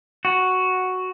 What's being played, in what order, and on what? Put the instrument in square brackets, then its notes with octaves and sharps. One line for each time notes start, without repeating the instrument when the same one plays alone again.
[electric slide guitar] F#4